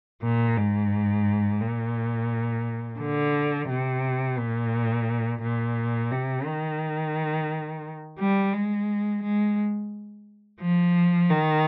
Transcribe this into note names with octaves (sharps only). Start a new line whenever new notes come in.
A#2
G#2
A#2
D3
C3
A#2
A#2
C3
D#3
G3
G#3
G#3
F3
D#3